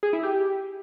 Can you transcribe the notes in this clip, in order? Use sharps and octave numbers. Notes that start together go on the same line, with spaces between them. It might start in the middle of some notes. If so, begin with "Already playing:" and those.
G#4
E4
G4